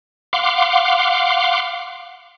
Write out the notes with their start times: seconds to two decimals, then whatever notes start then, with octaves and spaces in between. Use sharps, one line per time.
0.33 F5 F#5 C6 D6